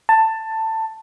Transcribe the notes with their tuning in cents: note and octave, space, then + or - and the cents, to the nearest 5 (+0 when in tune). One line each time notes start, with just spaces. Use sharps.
A5 +15